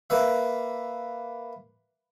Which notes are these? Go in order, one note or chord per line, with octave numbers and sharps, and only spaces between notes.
A#3 B4 E5